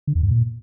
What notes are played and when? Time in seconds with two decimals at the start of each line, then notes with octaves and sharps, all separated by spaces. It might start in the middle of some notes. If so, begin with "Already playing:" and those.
0.07 D3
0.15 E2
0.23 G2
0.31 A#2